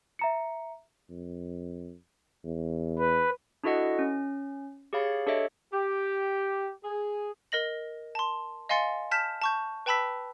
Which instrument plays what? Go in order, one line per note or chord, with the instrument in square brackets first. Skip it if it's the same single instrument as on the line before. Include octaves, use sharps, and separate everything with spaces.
[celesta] E5 A#5 C#7
[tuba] F2
E2
[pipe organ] B4
[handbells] D4 E4 F#4 A4 D#5 F#5
C#4
G4 G#4 C#5 F5 B5 A6
D4 G4 A4 C#5 D#5 E5
[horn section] G4
G#4
[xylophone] A#4 D#5 A#6 F#7
A5 C6
D#5 F5 G#5 C6 A6 C#7
A5 F6 G6 B6 E7
A5 C#6 G6
B4 G5 A5 B5 E6 B6